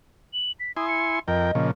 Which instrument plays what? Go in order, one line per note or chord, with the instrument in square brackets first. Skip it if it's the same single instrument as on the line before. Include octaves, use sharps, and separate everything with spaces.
[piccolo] F#7
B6
[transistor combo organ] E4 G#5 C6 [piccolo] D#6
[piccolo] C#7
[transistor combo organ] F2 A#4 G5 [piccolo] D#5
[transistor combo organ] A#2 C#3 F3